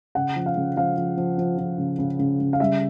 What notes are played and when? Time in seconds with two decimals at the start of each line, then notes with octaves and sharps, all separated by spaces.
0.15 C#3 F#5
0.36 F3
0.46 F5
0.56 C#3
0.76 F3 F5
0.97 F3
1.17 F3
1.38 F3
1.58 F3
1.78 C#3
1.99 C#3
2.19 C#3
2.40 C#3
2.53 F5
2.60 G3 E5